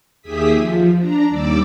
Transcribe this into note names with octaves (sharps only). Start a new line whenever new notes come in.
D#2 G4 G#4 E5 D#6 B6
F3
D4 A#5
D#2 G3 D5 D6 E6